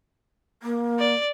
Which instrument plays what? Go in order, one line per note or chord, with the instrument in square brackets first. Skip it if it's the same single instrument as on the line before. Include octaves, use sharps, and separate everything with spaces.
[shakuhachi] A#3
[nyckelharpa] D5